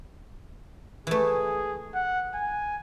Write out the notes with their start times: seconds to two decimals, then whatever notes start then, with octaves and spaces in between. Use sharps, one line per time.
1.07 E3 A3 G#4
1.94 F#5
2.34 G#5